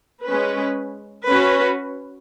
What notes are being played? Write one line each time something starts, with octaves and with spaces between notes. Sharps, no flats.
G#3 C#4 B4
C#4 F#4 B4